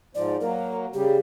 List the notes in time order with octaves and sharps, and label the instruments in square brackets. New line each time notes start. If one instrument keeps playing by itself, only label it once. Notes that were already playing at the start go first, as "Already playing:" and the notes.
[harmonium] G#2 F3 [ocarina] D5
[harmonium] F#3 A#3 [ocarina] A#4
[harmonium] C#3 G3 [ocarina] G4